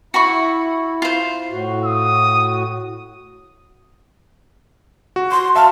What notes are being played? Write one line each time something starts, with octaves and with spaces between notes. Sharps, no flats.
E4 F#4 B5 C#6
F4 C5
A2 F#4
D#6
F#4
C6
E5 F5 A5 F6